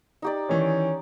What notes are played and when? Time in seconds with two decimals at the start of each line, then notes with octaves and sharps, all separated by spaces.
0.22 D#4 G4 D5
0.49 D#3 E3 C#4